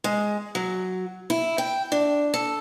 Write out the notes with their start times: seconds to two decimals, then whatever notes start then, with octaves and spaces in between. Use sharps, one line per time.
0.04 G#3
0.55 F#3
1.30 E4
1.58 G5
1.92 D4
2.34 A4